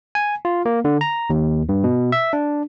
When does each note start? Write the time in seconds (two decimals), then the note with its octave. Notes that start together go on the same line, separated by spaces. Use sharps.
0.15 G#5
0.45 F4
0.66 A#3
0.85 D3
1.01 A#5
1.30 D#2
1.69 G2
1.84 B2
2.12 E5
2.33 D4